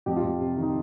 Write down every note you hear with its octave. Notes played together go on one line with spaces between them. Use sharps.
F2 G4
F4
F2 G4
C3
D#3
D#4